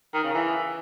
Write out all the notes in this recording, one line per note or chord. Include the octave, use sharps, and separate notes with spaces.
D#3
C#3
E3